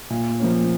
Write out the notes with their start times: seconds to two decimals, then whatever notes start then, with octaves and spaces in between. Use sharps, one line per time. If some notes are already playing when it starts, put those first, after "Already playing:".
0.10 A#2
0.40 F3 A#3 C#4